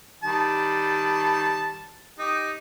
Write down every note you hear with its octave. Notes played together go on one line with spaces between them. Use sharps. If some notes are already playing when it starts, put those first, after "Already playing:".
D#3 G3 A5
D#4 G4